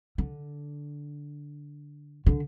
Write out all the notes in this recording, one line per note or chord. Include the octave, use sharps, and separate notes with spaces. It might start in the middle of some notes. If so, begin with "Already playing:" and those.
D3
D3